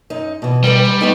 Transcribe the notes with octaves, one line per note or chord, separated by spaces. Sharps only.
F#2 D#4
B2 E3
B2 D#3 G3 B4
G#3
A3 B3 D#4